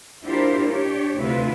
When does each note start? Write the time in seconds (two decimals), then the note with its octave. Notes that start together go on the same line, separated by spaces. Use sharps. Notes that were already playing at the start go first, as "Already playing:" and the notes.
0.23 D4 E4 F4 G4 A#4 C5
0.68 D4 G4 C#5
1.18 D2 C3 E4 F4 B4